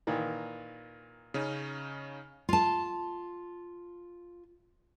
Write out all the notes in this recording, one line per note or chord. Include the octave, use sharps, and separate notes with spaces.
A#2 D#3 E3
C#3 C#4 D#4
F4 A5